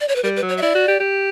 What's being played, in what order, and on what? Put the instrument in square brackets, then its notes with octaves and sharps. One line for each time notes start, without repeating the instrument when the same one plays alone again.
[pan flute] D5
C#5
B4
[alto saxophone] G3 [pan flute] A#4
[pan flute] B4
[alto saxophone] F#3
[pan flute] C#5
E5
[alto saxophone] E4 [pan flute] D5
[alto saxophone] F#4
G4
G4